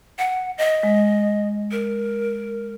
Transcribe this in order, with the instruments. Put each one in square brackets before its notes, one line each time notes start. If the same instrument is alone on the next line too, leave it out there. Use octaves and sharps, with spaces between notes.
[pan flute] F#5
D#5
[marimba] G#3
[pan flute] A#4